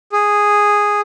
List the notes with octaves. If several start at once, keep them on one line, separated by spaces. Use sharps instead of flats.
G#4